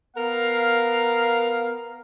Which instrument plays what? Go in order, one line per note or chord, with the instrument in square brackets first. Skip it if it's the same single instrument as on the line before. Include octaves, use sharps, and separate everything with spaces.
[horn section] B3 A#4 F5